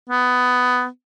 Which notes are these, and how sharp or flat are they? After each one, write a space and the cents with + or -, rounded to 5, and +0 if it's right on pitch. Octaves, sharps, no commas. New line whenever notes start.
B3 +15